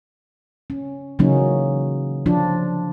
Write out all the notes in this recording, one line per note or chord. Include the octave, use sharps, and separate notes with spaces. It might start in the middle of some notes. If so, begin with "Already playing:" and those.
C#4
C#3 E3 F#3 A#3 C#4 D#4
F3 D4 F4